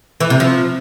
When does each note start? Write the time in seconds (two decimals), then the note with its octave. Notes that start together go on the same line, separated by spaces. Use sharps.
0.20 E3
0.30 C3
0.40 F3